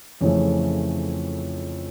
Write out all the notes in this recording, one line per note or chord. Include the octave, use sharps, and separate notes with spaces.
F2 C#3 E3 A3 C#5